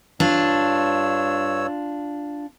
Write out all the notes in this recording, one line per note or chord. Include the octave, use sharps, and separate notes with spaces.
G2 D4 F4 C#5 E6